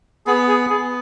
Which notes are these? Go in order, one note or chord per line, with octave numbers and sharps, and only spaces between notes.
B3 G#4
G#4
B3 G#4